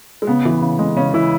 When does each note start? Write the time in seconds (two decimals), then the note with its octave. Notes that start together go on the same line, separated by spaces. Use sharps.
0.22 G#3
0.27 C#3 B3
0.45 E3
0.62 C#3
0.79 G#3
0.97 C#3 C#4
1.14 E3 E4